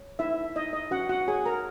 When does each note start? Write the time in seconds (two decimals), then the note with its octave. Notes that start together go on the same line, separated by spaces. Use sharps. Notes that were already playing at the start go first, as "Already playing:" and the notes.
Already playing: C#5
0.19 D#4 E4 E5
0.56 D#4 D#5
0.73 D#5
0.91 C#4 F#4 F#5
1.09 F#4 F#5
1.28 G#4 C#5 G#5
1.46 A#4 A#5